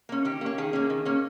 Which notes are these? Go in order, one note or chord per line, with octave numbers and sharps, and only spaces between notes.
A#3 C#4
D#3 G4
A#3 C#4
D#3 G#4
A#3 C#4
D#3
A#3 C#4